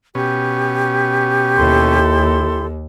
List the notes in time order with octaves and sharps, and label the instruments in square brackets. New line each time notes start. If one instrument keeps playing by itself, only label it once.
[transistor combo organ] B2 C#4 [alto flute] G4
[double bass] D#2 [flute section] E4 A4 C6